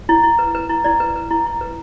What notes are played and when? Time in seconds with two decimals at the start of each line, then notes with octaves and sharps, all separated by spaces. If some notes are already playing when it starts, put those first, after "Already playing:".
0.09 E4
0.23 E4
0.39 B4
0.55 B4
0.70 E4
0.84 E4 D5
1.00 B4
1.16 B4
1.31 E4
1.46 E4
1.61 B4